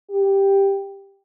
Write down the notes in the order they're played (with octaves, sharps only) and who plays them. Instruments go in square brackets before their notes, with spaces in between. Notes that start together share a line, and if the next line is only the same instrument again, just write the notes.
[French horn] G4